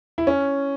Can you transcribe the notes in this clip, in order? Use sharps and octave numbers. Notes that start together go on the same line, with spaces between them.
E4
C#4